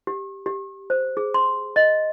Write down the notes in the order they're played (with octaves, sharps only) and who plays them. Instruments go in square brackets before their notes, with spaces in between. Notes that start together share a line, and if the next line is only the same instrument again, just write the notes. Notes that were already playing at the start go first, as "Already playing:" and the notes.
[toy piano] G4
G4
C5
G#4
C6
D#5